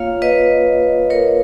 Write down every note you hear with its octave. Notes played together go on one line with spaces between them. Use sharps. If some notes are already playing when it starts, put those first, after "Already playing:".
Already playing: A#3 F4 C#5 F5
B4 D#5
A#4 C#5